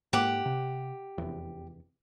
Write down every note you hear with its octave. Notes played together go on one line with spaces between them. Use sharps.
G#2 A#3 G4 F#5 D6
C3
F1 E2